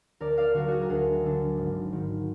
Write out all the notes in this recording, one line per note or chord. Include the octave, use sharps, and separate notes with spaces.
D2 A#4 D5
D5 F5
D3 F#3 D4 F#4 A#4
F#4 G#4
A#4
D2 G#4
D3 F#3 D4
G#1
G#2 D#3